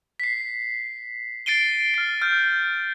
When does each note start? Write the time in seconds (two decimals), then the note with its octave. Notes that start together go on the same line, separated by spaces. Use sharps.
0.20 B6 C7
1.46 A6 C7 D7 D#7 G7
1.94 F6 C7
2.22 F6 G6